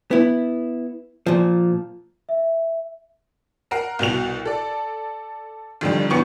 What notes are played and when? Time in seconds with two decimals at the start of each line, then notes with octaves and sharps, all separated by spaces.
0.11 B3 E4
1.26 A#2 F3
2.29 E5
3.71 A#4 F#5 A#5 C7
3.99 C2 B2 F#4 F7
4.45 A4 D5
5.81 G#1 F2 D3 G3
6.10 G1 E3 F#3 B3 C#6 C#7